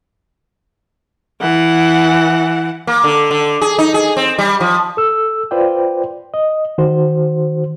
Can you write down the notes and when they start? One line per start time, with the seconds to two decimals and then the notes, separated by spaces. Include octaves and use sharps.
1.41 E3 F#5
2.87 A#3
3.04 D3
3.31 D3
3.61 G#4
3.78 D#4
3.94 G#4
4.17 C4
4.38 G3
4.60 F3
4.97 A4 E6
5.51 F4 B4 C5 D5 G5
6.34 D#5
6.78 D#3 F#4 C5